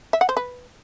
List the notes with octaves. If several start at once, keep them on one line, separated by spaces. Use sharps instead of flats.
E5
F#5
C5
B4